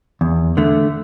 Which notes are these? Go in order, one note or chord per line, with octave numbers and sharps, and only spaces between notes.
E2
D3 A3